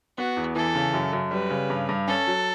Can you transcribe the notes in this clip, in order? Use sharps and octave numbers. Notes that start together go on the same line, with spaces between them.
B3 F#4
E2
E3 A4
C#3
F#2
F#2
G3 B4
C#3
G2
G2
C#4 A4
F#3